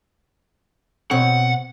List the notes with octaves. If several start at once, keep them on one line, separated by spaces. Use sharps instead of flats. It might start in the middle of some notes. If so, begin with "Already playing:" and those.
B2 C4 C#5 F#5